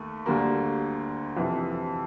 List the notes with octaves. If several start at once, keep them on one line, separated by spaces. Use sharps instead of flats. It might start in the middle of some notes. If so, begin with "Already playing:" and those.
Already playing: D#2 A3
D2 D3 G3 A#3
F2 C3 E3